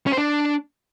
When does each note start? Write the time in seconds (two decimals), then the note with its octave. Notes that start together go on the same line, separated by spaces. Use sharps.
0.07 C#4
0.12 C5
0.18 D4